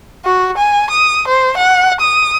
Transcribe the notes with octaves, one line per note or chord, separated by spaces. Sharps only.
F#4
G#5
D#6
C5
F#5
D#6